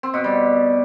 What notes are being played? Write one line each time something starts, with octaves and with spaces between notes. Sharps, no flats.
C4
B2
G3